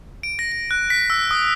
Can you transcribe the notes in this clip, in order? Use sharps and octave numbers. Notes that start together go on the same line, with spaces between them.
D7
A#6
A#6
F#6
B6
E6
D#6